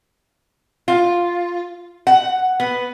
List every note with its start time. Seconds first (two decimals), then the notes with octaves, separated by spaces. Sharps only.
0.88 F4
2.07 F#5
2.60 B3